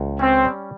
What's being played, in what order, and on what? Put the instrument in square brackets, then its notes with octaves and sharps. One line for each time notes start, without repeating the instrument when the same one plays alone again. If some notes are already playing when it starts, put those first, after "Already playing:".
Already playing: [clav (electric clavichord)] C#2
[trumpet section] C4 [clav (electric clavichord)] C#4
[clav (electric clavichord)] G3